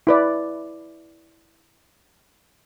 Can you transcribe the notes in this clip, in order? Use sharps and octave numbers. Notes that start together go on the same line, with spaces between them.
E4 B4 D5